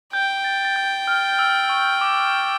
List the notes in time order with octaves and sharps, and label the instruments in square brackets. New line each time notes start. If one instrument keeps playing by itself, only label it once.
[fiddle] G5 [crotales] G6
[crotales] A6
A6
G6
F6
E6
C#6
D6